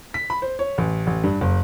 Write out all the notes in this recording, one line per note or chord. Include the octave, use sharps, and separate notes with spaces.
B6
B5
C5
C#5
A1
A1
G2
F#1